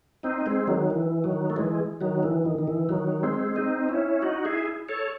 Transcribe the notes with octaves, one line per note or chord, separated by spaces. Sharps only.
C4 D#4
G#3 C4
D#3 F#3
E3
D#3 F#3
A3
E3 G#3
D#3 F#3
E3
D#3
D#3
E3
D#3 F#3
G#3 C4
C4 D#4
C#4 E4
D#4 F#4
E4 G#4
A4 C#5